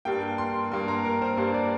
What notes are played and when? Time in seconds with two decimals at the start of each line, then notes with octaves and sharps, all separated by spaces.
0.05 G2 G3 A#3 G5
0.38 C6
0.72 G2 G3 A#3 C6
0.88 A#5
1.05 A#4
1.22 C5
1.37 G2 G3 A#3 C5
1.54 D5